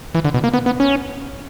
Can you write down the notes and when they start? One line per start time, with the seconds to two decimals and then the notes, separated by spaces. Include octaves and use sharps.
0.15 E3
0.25 D3
0.34 B2
0.44 A#3
0.54 B3
0.66 B3
0.80 C#4